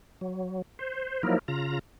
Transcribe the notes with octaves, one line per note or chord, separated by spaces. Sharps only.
F#3
C5
F3 F#3 A#3 D#4 E4 A#4
C#3 F4 A#5